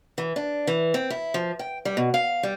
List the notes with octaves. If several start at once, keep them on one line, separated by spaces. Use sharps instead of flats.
E3
D4
E3
C4
E4
F3
G5
G3
B2
F5
G3